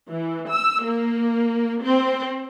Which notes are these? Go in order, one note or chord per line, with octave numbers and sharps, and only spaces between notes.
E3
E6
A#3
C4